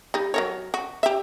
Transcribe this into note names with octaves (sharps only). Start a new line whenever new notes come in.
G3 D#4
F#3 A#4 C#5
F#4
G4 E5